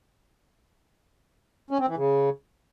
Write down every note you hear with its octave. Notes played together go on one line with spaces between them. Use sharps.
C#4
C4
E3
C#3